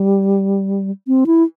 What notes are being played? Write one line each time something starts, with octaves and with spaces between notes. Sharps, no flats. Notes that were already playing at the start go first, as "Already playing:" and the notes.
Already playing: G3
C4
E4